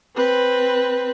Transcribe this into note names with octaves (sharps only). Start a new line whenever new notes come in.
C4 B4